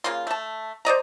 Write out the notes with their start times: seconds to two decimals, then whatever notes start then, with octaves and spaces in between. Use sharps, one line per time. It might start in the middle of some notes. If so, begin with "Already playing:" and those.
0.04 C#3 A#3 F4 C6
0.27 A3 A5
0.85 C5 D5 D#5 A#5